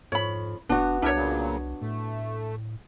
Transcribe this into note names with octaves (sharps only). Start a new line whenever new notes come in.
F2 G#2 C#5 B5
F1 B3 D4 F#4
C2 D4 E4 A#4 C#5 E5
A#2 C#3 F#3
A2 A3